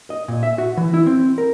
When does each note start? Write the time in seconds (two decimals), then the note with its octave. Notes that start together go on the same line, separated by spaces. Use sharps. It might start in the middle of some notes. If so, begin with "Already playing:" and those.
0.10 D#5
0.28 A#2
0.43 E5
0.58 F#4
0.77 E3
0.94 E4
1.06 C4
1.38 A#4